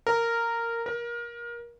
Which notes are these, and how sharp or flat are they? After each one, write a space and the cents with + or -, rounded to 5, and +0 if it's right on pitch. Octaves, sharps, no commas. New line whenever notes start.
A#4 -10
A#4 +25